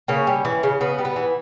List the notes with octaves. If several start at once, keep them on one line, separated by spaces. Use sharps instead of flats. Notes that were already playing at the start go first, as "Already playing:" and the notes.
C#3 A#3 C#4
G3
E3
C#3
C#3 B3
G3
B3
E3